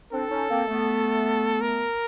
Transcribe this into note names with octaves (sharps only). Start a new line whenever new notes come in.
C4 D4 A4
C#4 D#4
A#3 C4
A3 B3
A#4